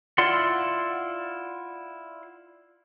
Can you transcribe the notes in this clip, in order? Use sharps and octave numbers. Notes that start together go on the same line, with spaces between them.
E4 F4 D5 F#5 C6